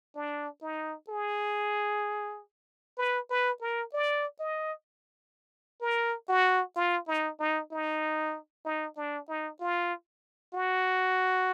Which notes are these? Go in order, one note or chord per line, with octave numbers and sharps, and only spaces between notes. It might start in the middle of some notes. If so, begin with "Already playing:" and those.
D4
D#4
G#4
B4
B4
A#4
D5
D#5
A#4
F#4
F4
D#4
D#4
D#4
D#4
D4
D#4
F4
F#4